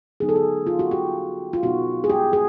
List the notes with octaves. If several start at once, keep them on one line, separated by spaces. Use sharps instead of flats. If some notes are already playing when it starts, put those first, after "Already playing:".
D3 F#3 B3 D#4 G#4
A4
G#4
F4
F#4
G4
F4
B2 F#3 B3 D#4 F#4
G#4
G4
G#4